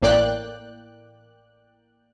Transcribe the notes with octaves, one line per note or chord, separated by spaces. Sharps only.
A1 A2 A#3 D5 G5 F#6